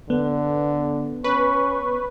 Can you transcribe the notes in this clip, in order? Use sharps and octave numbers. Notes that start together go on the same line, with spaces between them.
D3 B3
C#4 B4 C#6